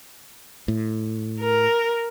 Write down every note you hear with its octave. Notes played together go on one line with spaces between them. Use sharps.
A2
A#4